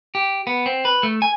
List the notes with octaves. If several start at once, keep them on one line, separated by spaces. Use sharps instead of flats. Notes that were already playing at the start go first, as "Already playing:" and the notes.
G4
B3
C4
B4
A3
G#5